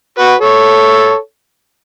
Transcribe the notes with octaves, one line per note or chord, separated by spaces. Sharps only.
F#4 B4
A4 C#5